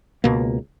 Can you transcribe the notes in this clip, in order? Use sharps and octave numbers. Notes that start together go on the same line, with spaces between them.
C#2 B2 A#3